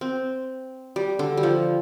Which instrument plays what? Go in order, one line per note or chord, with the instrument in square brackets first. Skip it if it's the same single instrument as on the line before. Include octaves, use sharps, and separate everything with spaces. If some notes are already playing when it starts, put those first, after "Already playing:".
[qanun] C4
G3
D3
G3
F3